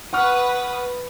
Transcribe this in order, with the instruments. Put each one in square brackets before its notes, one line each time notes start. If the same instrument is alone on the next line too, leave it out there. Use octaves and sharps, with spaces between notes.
[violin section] B4 D#6 [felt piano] F#5 C#6 F6